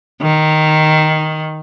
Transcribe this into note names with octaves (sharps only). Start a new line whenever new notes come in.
D#3